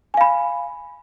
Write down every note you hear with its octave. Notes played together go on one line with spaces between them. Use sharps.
F5 G#5 B5